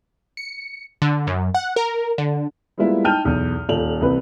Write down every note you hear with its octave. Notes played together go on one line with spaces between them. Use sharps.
C#7
D3
F#2
F#5
A#4
D3
G3 G#3 A#3 B3 E4 F4
D#4 G5 A5 F6 G6 D#7
B1 E2
D#1 F4 A4 F7 F#7
C2 C3 E3 B4